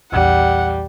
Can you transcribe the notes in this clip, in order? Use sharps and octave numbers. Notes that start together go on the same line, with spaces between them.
A#1 E2 G3 F#5